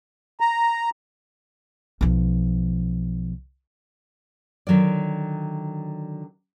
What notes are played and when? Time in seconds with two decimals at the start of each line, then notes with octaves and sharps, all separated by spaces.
0.40 A#5
2.01 B1 F3
4.67 D3 D#3 F#3 F4 D5